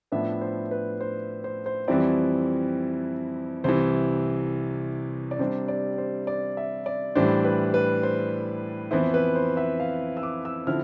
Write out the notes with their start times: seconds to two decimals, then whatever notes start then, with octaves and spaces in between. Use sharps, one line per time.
0.12 A2 F3 B3 D4 E5
0.41 C5
0.71 B4
1.01 C5
1.44 C5
1.66 C5
1.88 F2 E3 G3 C4 E4 D5
3.64 C2 C3 E3 C5
5.31 D5
5.39 C3 G3 D4 C5
5.68 D5
5.98 C5
6.27 D5
6.57 E5
6.86 D5
7.15 A2 E3 G3 D4 C5
7.44 B4
7.74 B4
8.03 C5
8.91 F2 E3 B3 E4 C5
9.14 B4
9.35 C5
9.57 E5
9.80 F5
10.17 E6
10.23 D6
10.45 E6
10.67 D3 F3 C4 E4 F6